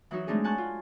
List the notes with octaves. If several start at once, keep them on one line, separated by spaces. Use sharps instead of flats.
E3 F#3 D#4 F#4
G#3 A3 C4 D4 D#4 G#4
F#5 G#5 A5 C#6 F#6 G6
F4